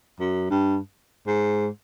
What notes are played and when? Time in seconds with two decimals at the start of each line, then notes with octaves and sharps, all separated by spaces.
0.20 F#2
0.50 G2
1.27 G#2